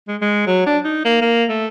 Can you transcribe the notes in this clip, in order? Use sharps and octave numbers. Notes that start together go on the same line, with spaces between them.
G#3
G#3
F#3
D4
D#4
A#3
A#3
A3